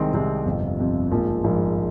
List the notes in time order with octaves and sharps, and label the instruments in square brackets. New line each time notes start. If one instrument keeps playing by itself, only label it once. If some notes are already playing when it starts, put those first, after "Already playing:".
Already playing: [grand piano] C2 C3 D#3 G#3 C4
C2 C3 D#3 G#3 C4
G1 F2 C3
G1 F2 C3
A#1 G#2 F3 A#3
A#1 G#2 F3 A#3